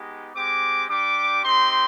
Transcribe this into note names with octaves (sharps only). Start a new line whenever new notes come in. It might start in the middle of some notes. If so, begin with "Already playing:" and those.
Already playing: G#3 B3 D#4 G4
G#3 C4 G4 D6
G3 D4 G4 D6
C4 D#4 G4 C6